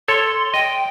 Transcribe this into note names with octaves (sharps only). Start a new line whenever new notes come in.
A4 C#5 C6
D#5 G5